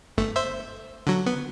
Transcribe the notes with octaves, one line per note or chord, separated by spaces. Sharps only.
G1 A3
C5 E5
D3 F#3
B3